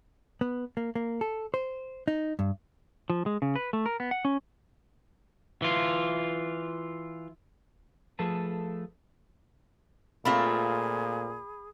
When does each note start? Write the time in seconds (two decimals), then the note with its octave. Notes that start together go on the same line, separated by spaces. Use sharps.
0.41 B3
0.77 A#3
0.95 A#3
1.21 A4
1.54 C5
2.08 D#4
2.39 G2
3.10 F3
3.26 G#3
3.42 C#3
3.56 B4
3.73 A3
3.86 A#4
4.00 B3
4.11 F#5
4.25 C#4
5.62 E3 F4
8.19 F3 A3 G#4 A4 B4 A5
10.25 A#2 A3 C4 F4 G#4 B5